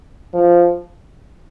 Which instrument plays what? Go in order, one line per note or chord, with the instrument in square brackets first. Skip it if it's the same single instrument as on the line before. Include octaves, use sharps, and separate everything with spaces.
[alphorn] F3